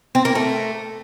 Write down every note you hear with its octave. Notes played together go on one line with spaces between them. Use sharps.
C4
A#3
A3